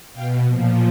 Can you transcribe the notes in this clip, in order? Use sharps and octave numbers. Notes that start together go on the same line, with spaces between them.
B2 F5 G5
A#2 F3